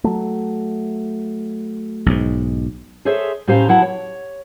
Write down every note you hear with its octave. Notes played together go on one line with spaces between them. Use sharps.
F#3 A3
B1 G#2
G#4 A4 C5 C#5 E5
A2 C#4 G4 C5 F5 A#5
F2 F#3 E4 F#5 A5
C#5